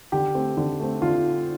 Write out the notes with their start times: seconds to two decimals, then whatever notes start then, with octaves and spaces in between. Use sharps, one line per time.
0.12 D3 G4
0.35 A3 C4
0.57 D3
0.80 A3 C4
1.02 D3 F4